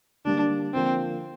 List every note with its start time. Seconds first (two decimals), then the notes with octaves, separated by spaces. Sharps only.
0.25 D3 G3 A#3 D4
0.74 D3 F3 A#3 C4 D4